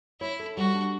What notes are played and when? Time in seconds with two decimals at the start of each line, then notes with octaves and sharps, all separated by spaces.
0.21 E4 C#5
0.39 A4
0.57 G3 F#4
0.75 D4